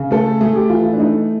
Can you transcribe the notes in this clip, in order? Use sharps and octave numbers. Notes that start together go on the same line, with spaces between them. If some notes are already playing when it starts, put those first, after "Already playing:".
Already playing: C#3
A3 A4
A3 G#4
G4
E3 F4
E4
D4
A3 D#4